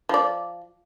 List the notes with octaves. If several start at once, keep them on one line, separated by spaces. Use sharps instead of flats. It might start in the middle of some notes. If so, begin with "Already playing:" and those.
F3 D5